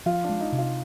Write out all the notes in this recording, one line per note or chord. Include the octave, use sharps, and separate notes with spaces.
F3 F4
D4
G#3
D#4
C3
F4